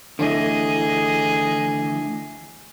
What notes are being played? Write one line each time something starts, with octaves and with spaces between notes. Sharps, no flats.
D3 E3 A3 G#4 D#5